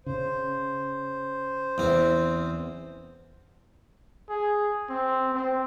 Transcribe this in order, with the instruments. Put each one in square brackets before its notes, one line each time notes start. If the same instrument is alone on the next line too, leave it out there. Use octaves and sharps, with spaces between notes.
[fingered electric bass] C#3 [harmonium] C5
[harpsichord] E2 C4
[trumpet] G#4
C4
C4